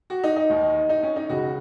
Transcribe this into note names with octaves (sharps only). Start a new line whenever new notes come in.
F#4
D#4
D#4
D#2 D#3
D#4
C#4
D#4
C#2 C#3 F#4